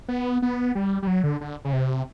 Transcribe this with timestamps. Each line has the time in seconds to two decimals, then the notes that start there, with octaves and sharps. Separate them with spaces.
0.08 B3
0.42 B3
0.75 G3
1.02 G3
1.07 F#3
1.24 D3
1.41 D3
1.65 C#3
1.73 C3